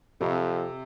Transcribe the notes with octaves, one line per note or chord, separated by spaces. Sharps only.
F2 C3